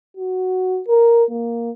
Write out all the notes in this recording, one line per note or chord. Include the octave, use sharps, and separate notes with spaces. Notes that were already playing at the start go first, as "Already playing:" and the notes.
F#4
A#4
A#3